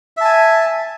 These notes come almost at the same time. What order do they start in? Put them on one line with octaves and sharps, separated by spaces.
E5 A5 G#5